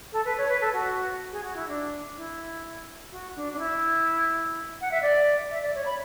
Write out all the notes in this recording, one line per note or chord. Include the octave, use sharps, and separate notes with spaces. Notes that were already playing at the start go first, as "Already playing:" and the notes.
A4
B4
C#5
B4
A4
F#4
G#4
F#4
E4
D4
E4
F#4
D4
D4
E4
F#5
E5
D5
E5
D5
C#5
B5